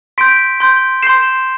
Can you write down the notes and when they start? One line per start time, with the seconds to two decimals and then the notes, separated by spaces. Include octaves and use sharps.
0.18 C6 G6 B6 D7
0.60 C6 G6
1.03 C6 G6 C7 E7